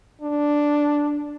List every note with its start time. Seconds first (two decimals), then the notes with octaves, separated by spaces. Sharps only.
0.21 D4